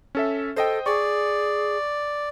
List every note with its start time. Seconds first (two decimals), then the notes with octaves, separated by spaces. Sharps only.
0.15 C#4 A4 E5
0.56 A4 C5 D#5 G5
0.86 G#4 D5 C#6